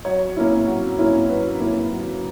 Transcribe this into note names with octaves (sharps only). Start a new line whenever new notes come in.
F#3 C#5
A#3 C#4 E4
F#3
A#3 C#4 E4
F#3 B4
A#3 C#4 E4
F#3